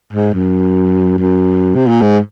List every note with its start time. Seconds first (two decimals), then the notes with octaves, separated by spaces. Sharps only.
0.13 G#2
0.33 F#2
1.18 F#2
1.75 C3
1.88 A#2
2.01 G#2